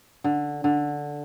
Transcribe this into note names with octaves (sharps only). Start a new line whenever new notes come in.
D3
D3